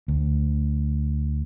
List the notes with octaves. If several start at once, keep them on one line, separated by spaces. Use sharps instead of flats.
D2